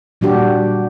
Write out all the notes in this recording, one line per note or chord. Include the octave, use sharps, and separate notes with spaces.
A#2 G3 D4 F#4 G4